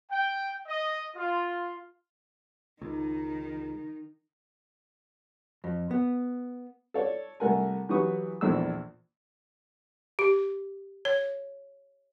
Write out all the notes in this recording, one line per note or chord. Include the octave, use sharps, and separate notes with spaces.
G5
D#5
F4
C#2 D#3 D#4
F2
B3
A4 C#5 D5
C2 A3 A#4 F#5 G#5
E3 F#3 G4 B4 C#6 D#6
A#1 E2 D4 A4 C5 E6
G4
C#5